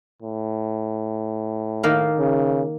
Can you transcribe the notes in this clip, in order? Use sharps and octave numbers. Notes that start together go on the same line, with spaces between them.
A2
D#3 A#3 F5
C#3